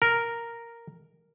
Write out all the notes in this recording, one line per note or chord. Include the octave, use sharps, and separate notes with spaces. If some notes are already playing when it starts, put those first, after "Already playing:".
A#4